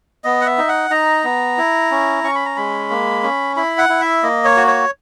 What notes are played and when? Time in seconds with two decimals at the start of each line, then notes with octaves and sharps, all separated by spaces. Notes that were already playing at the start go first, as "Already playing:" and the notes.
0.24 B3 D#5
0.41 F#5
0.46 E5
0.58 D#4
0.68 F#5
0.90 D#4 A#5
1.24 B3
1.58 E4
1.91 C#4
2.24 C#4 C#6
2.35 B5
2.46 A#5
2.56 G#3 B5
2.90 A#3
3.23 C#4
3.57 E4 B5
3.78 F#5
3.89 E4
4.01 E5
4.23 A#3 D#5
4.45 C#5
4.57 F#4
4.67 C#5